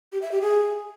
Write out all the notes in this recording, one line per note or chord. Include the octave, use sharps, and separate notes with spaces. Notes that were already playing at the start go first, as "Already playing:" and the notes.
G4
E5
G4
G#4